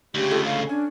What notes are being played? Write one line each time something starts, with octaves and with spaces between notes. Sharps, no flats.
D2 C#3 G4
G#3 F4 A4
F5
C#4 D4